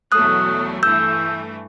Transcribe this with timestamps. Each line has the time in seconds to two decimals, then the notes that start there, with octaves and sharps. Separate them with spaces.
0.12 E2 B2 F#3 A3 D#6 F#6
0.83 G2 E3 A3 E6 G6